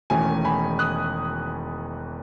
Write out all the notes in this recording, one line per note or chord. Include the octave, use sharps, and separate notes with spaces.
E1 E2 D#3 A3 C#4 G#5
G#5 B5
D#6 F#6